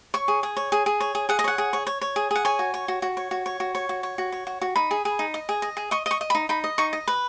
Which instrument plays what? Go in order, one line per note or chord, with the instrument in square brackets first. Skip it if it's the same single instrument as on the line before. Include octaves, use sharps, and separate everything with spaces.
[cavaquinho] C#5 C#6
G#4
G#4
C#5
G#4
G#4
C#5
G#4
G#4 F#5
D#5
C#5 F#5
G#4
C#5
C#5
C#5
G#4
G#4 F#5
C#5 G#5
F#4
C#5
F#4
F#4
C#5
F#4
C#5
F#4
C#5
F#4
C#5
F#4
C#5
F#4
F#4
D#4 B5
G#4
G#4
D#4
D#5
G#4
D#5
G#4
D#5 C#6
D#5 C#6
D#5
B5
D#4
D#4 B5
D#5
D#4 C#6
D#5
B4